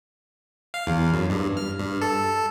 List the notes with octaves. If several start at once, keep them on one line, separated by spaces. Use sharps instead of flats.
F5
E2
F#2
G2
F6
G2
A4